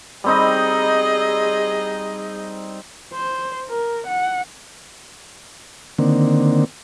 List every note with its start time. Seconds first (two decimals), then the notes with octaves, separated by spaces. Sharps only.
0.24 G3 C4 D#4 G#4 D#5
3.14 C5
3.69 A#4
4.07 F#5
5.98 D3 D#3 A#3 C4